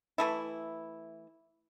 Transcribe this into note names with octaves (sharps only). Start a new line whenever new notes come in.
E3 A3 E4